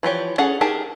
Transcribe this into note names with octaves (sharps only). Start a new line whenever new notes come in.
E3 F3 G4 C#5
C#4 G#4 A4 F#5
D#4 G4 G#4 A#4 A5